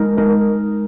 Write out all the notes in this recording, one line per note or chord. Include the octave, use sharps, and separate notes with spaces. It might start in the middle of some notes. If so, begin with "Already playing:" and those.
Already playing: G#3 D#4 A#4
G#3 D#4 A#4